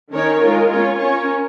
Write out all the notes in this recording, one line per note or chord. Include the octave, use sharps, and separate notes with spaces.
D#3 C#4 A#4 C#5
G#3 F4 A#4
C#4 F4 C#5
C#4 A#4 C#5